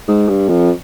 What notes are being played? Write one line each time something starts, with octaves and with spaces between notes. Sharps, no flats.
G#2
G2
F2